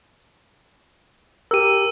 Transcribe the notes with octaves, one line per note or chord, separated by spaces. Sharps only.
G4 A#4 E6 D#7